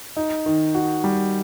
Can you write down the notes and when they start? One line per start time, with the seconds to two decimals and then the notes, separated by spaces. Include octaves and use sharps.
0.17 D#4
0.46 D#3
0.75 F#4
1.04 G3